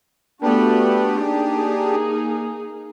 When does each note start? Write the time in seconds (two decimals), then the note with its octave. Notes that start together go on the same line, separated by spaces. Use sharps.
0.42 A3 B3 D4 F#4 G4
1.20 A#3 D#4 G#4